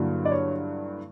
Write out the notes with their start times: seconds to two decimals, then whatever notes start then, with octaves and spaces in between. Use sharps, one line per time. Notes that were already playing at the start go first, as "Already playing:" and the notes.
Already playing: G2 D3 F#3 A#3 E4
0.25 D5
0.31 C#5